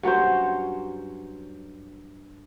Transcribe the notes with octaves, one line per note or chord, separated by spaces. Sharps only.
G2 F#3 C#4 C5